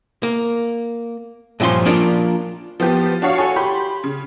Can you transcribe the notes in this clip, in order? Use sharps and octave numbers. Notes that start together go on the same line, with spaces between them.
A#3
G2 A#2 F3 C#4 C6
F3 A#3 D4 F4 A#4 D5
F3 B3 F4 G4
D4 F#4 C#5 F5
F#4 A4 C#5 G#5
G4 B5 C6
C#3